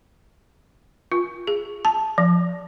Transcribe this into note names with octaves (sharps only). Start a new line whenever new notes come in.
F4
G#4
A5
F3